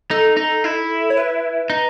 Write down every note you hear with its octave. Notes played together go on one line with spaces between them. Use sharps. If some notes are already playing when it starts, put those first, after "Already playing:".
D#4 A4
D#4
E4
C#5
B4
D#4